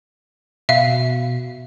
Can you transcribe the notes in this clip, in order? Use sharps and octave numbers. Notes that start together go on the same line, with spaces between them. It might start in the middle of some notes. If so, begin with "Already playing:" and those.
B2 E5 F5